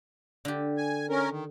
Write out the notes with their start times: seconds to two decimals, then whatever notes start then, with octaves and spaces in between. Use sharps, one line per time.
0.45 D3 G4
0.77 G#5
1.10 C#4 A#4
1.30 D#3